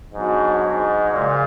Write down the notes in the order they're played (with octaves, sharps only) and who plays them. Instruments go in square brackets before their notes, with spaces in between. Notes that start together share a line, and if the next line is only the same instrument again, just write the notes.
[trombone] G#2 [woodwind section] F#3 B3 D4 F#4
[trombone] G#2
[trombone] A#2 [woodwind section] C#3 F3 G#3